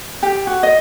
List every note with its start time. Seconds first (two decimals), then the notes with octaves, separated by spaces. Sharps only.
0.23 G4
0.47 F#4
0.63 D#5